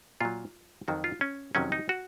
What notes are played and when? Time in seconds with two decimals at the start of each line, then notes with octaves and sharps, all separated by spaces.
0.21 A#2 F#3 F4
0.88 F2 D#3 F#3 F#4
1.04 F4
1.21 C#4
1.55 F2 C3 D#3 F#3 C#4
1.72 D#4
1.89 F#4